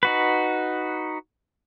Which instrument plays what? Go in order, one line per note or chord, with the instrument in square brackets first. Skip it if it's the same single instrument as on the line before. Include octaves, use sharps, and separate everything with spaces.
[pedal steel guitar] D#4 F#4 B4